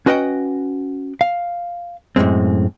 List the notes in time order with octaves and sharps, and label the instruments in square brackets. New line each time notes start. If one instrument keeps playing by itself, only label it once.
[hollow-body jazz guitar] C#4 F#4 B4 D#5 F#5 G5
F5
F#2 A2 C3 G#3 C4